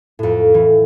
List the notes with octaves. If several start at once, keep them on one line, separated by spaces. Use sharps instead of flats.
F2 A2
E3